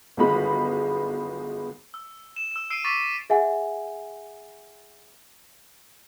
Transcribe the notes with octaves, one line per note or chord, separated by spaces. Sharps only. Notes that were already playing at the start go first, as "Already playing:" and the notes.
G1 F#2 D#3 G#3 B3 B5
E6
E7
E6 E7
E6 C7 D7 D#7
C#6 D6 A6 B6 D#7
G#4 E5 F#5 G#5